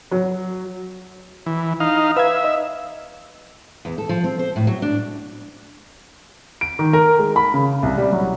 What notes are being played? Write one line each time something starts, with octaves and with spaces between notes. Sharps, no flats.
F#3
E3
D#4 F5
B4 E5 F5 G#6
D#5
E2
A4
F3
C4
C5
A2
F#3
D4
D7
D#3
A#4
G#3
B5
C#3
C2
G3
F#3